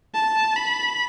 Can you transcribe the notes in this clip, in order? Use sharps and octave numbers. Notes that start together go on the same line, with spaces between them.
A5
B5